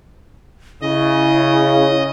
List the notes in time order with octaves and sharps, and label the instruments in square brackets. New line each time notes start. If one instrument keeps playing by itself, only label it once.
[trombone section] C#3 [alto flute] E4 [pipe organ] D#5